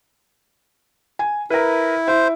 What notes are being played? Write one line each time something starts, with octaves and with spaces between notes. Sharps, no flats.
G#5
E4 A#4 B4
E4 C5